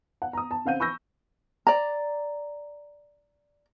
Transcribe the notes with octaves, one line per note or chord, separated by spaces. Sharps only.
F#5
A#5 D#6
A5
C#3 C4 F5 F#5 G6 D#7
B5 C#6 E6 G6 A#6
D5 A#5